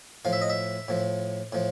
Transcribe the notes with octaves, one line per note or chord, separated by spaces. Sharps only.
A2 F3 F5
E5
D#5
E5
A2 F3
A2 F3